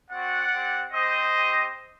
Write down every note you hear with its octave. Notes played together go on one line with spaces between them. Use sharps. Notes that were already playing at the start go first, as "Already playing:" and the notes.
C4 F#4 D5 F#5
C4 G4
C4 G4 C5 D#5
C4 G4